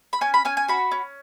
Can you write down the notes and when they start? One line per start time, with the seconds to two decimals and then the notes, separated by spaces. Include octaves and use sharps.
0.13 B5
0.21 C#4 G#5
0.34 B5
0.45 C#4 G#5
0.57 G#5
0.68 F#4 B5
0.91 C#4